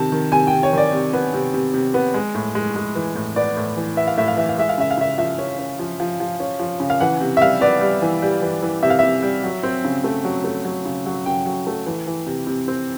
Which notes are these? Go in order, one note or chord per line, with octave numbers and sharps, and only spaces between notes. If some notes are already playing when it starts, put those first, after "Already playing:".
Already playing: C3 D#3 A5
D#3
C3 G#5
G5
C3
C#5
D#3 D5
C3
B3
C3
C3
C3
B3
G#3
A2
G#3
G#3
E3
A2
B3 D5
A2
E3
B3 E5
F5
A2 E5
F5
E3 E5
F5
G#3 E5
F5
C#3 E5
F5
C#3 E5
F3 E5
C#4
C#4
F3
F3
F3
C#4
F3
C#3
F5
E3 F#5
C3
E5
G3 F5
B3 D5
G3
E3
G3
E3
E3
C3 E5
F5
C3 E5
G3
F#3
C4
C#3
A3
F#3
A3
F#3
C#3
F#3
C#3 G5
F#3
A3
E3
E3
C3
C3
C4